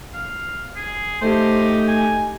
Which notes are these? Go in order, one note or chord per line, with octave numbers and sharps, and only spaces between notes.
F5
G#4
A3 D#4 G4 C5
G#5